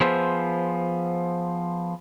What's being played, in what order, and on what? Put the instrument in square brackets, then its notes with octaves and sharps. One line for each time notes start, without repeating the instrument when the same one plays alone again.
[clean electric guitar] F3 B3 G#4 C5 E5